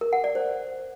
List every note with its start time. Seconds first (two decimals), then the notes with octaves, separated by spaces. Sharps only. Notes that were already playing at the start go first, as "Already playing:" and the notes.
0.01 A#4
0.13 F#5
0.24 D5
0.35 C5